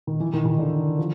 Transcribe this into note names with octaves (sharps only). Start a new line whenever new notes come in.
D#3
E3
D#3
D#3
D3
F3